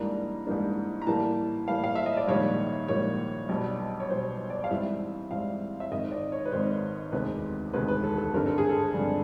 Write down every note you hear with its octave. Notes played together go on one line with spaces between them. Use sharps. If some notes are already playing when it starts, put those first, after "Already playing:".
Already playing: G#2 E3 G3 A#3 D4 A#5
G#2 E3 G3 A#3 D4
A#5
A2 E3 G3 A#3 A5
A2 E3 G3 A#3 F5
F5
E5
D#5
D5
A#1 G#2 D#3 G3 A#3 C#5
A#1 G#2 D#3 G3 A#3 C#5
B1 B2 G3
C#5
B1 B2 G3 C5
D5
F5
G#2 E3 G3 C4 E5
G#2 E3 G3 C4 F5
E5
G#1 G#2 D#3 D#5
D5
C#5
B4
G#1 G#2 D#3 C5
E1 D2 C3 D#3 G#3 B4
E1 D2 C3 D#3 G#3 B4
B4
A4
A4
G#1 G2 D3 G3 A#4
A4
G#4
A4
G#1 G2 D3 G3